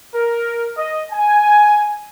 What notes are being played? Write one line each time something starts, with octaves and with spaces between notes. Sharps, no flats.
A#4
D#5
G#5